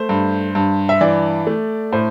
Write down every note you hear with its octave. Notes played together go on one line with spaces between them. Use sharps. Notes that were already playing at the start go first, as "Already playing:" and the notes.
Already playing: A3 C5
G2
G2
E5
E3 D5
A3
A2 C5